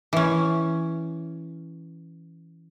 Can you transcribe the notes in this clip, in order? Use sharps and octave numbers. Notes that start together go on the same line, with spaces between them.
E3 C#4